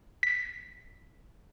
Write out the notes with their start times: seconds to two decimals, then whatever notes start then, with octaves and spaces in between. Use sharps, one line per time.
0.23 B6